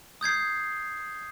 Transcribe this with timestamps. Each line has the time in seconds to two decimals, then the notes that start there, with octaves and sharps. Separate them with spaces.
0.21 D#6 G6 G#6 C7